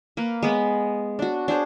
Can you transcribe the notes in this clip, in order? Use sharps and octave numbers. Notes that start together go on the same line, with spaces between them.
A#3 A#4 B4
G#3 B3 B5
D4 F#4
D4 G#4 C5 C#5